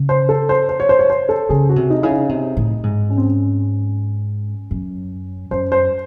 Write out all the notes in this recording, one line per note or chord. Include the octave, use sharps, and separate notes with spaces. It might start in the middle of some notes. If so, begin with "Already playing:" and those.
Already playing: C#3
C5
A4
C5
C5
C#5
C5
C#5
C5
A4
C#3 G#4
F#4
C3
D#4
C#3 E4
D#4
C3
A2
G#2
C#4
C4
C#4
F#2
F#2 C5
C5